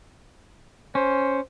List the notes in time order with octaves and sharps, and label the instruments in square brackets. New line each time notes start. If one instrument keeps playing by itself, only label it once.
[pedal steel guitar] C#4 [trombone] C5